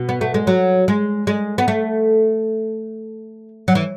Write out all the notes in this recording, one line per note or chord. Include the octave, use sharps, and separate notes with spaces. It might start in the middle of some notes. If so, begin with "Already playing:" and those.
Already playing: B2
B3
A3
G#3
F#3
G#3
G#3
B3
A3
F#3
E3